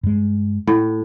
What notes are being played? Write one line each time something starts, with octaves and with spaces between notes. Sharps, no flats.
G2 G#3
A2 A3